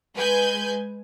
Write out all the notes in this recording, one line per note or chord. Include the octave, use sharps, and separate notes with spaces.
G#3 B4 G#5 G6